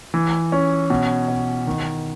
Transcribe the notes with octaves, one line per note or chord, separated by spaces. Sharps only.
E3
C#4
B2
B2
D#3